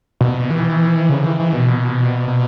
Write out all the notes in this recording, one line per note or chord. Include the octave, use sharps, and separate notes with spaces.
B2
E3
C#3
E3
E3
B2
B2